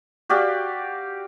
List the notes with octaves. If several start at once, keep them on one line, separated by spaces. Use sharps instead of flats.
F#4 G4 D5 F5